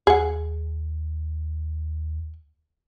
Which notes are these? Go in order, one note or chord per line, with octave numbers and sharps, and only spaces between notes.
D#2 G#4 F#5